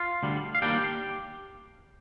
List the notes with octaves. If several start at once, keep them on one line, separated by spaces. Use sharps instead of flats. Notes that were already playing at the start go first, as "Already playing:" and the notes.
Already playing: F4 F5
D2 D3 G3
F5
D#2 D3 G3 A#3 D4 G4 G5